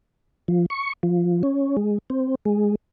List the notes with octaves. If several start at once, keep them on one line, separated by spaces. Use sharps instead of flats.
F3
C#6
F3
C#4
G#3
C4
G#3